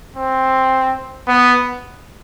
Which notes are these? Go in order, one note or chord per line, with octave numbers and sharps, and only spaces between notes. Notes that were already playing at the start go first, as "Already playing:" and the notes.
C4
B3